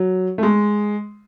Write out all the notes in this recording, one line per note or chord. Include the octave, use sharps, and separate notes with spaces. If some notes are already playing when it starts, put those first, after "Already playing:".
Already playing: F#3
A3
G#3